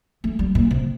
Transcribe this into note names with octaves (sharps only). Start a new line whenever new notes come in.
A3
G3
A#2
C3